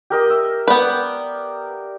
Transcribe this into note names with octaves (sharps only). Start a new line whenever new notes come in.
G4 A#4 D#5
E5
B3 B4 D5 G5